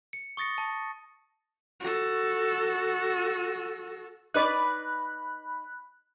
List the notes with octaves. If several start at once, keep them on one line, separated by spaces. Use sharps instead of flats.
C#7
C#6 D#6 A6 A#6 C#7
A5
F#4 A4
D#4 B4 D5 B5 F#6